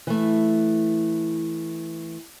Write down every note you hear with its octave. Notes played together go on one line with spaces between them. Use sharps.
E3 A3